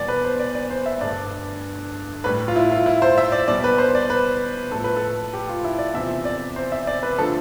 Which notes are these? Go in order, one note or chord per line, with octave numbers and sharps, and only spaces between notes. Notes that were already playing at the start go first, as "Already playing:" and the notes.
Already playing: E2 B2 G3 D5
B4
C5
D5
D5
C5
E5
G2 D3 A3 D5
A2 G3 B4
F4
E4
F4
E4
C5
E5
D5
B2 G3 D5
B4
C5
D5
B4
A2 F3 A3 A4
B4
A4
G4
F4
E4
D5
E2 C3 F3 E5
D5
C5
E5
D5
B4
D3 F3 A3 A4